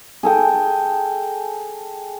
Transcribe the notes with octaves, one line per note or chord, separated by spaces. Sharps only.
G#4 A4 G5